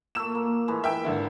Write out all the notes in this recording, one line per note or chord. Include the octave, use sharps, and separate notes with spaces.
A#2 A3 E6 E7
A#3
A2 E3 G#3
E3 A#4 E5 G5 E6
G#1 D3 E4